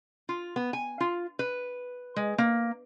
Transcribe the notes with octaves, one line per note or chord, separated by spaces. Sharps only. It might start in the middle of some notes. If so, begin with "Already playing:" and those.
F4
B3
G#5
F4
B4
G#3
A#3